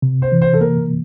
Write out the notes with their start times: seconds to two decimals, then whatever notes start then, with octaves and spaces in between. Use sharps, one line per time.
0.02 C3
0.22 C5
0.32 E3
0.42 C5
0.53 A4
0.61 A#3 A#4